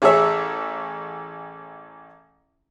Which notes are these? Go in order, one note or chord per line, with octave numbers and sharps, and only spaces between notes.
A1 G#4 C#5 E5